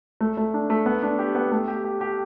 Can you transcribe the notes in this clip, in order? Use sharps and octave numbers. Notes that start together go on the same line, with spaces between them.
A3
A3
D4
A3
B3
D4
G4
B3
A3
G4
G4
G4